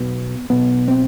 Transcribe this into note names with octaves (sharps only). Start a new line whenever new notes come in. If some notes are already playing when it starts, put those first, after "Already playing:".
Already playing: B1 B2 B3
B1 B2 B3
C4